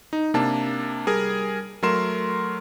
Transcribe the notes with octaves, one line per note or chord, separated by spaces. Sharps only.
D#4
C3 A#3 D4 A5
G3 G#4 A#4
F#3 A3 A#4 C6 E7